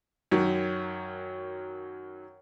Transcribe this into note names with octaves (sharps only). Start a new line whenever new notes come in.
F#2 D#3 F#3